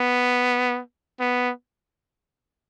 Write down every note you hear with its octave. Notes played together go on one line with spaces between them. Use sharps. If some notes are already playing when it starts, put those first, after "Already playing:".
Already playing: B3
B3